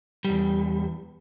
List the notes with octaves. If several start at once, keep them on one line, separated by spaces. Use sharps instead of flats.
E2 G3